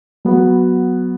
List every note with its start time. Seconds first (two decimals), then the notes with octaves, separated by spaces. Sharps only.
0.25 F#3 B3 F#4